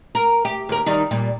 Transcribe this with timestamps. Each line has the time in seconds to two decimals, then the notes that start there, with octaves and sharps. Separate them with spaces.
0.15 A#4
0.45 G4
0.69 D#2 A#4
0.86 D#3 G3 D#4
1.11 A#2 G3